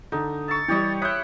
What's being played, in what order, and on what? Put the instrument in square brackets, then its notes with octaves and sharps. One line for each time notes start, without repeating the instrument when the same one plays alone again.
[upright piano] D3 [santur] D#4
[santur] C#6 E6 [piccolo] A6
[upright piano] E3 G3 [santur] G4 C#5 D#5
[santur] E4 B5 D#6 [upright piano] C#5 G6 [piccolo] F#6